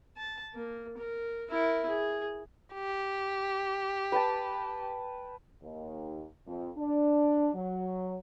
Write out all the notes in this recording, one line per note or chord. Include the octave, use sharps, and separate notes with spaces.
A5
A#3
A#4
E4 A#4
G#4
G4
B4 G5 A5
D#2
F2
D4
F#3